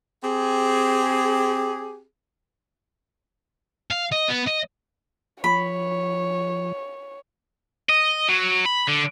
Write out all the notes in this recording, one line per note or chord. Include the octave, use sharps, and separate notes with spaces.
C4 G4 G#4
F5
D#5
B3
D#5
F3 C#5 B5
D#5
F#3
B5
D3